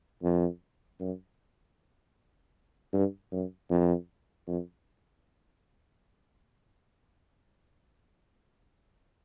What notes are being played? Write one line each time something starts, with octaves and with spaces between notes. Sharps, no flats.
F2
F#2
G2
F#2
F2
F2